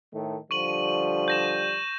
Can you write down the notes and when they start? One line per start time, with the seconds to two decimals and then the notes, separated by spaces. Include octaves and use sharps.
0.12 A2 D#3 A3
0.51 D3 F3 G3 C#6 D#7 F#7
1.28 G6 A#6 E7